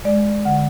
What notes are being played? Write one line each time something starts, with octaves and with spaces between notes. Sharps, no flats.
G#3 D5
D3 F#5